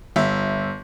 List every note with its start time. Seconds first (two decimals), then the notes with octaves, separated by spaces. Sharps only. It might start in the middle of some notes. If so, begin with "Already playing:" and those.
0.16 G1 E5